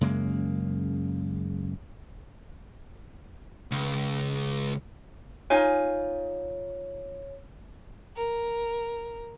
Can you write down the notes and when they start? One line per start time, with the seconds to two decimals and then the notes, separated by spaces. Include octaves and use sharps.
0.01 F#2 C#3 G#3 A#3
3.71 C#2
5.50 D#4 F4 C#5 G#5
8.16 A#4